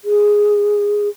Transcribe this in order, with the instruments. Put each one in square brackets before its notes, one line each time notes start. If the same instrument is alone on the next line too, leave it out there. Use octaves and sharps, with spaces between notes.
[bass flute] G#4